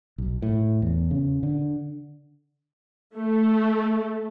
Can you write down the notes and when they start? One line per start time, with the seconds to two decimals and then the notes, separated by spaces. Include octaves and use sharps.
0.18 B1
0.42 A2
0.82 E2
1.11 C#3
1.43 D3
3.15 A3